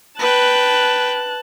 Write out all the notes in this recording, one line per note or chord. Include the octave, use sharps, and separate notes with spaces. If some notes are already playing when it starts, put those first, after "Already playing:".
B4 G5 A5 F#6